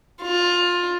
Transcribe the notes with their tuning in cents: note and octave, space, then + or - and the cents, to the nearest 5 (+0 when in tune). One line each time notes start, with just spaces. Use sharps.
F4 +15